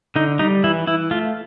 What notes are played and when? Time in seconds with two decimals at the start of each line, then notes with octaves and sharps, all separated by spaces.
0.16 D3 D#4
0.39 G3 D#4
0.64 E3 E4
0.87 E3 E4
1.11 A3 F4